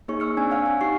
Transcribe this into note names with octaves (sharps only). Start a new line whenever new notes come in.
A#3 D#4 G#4 C#5 C#6
C#6 E6 F6 C#7
C4 D4 D5 G#5
C#5 F5 F#5 F6
G#5
D#4 G4 C#6 C7